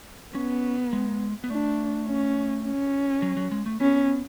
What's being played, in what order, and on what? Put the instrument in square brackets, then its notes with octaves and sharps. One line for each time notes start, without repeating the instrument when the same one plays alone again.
[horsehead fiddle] B3 [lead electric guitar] C#4
[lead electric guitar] G#3
B3
[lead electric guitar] A3 [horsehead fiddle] D4
[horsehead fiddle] C#4
C#4
[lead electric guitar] F#3
F#3
G#3
A3
[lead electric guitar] B3 [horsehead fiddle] C#4